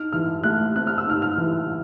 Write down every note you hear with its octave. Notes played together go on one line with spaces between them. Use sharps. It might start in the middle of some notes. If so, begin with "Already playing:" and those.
Already playing: D#4 F6
E3 F6
A3 F#6
C4 F#6
F6
E6
D#4 F6
F6
E3